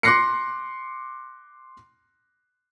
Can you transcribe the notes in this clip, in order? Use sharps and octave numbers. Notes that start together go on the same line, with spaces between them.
C6 D6 F#6 A#6 C7 C#7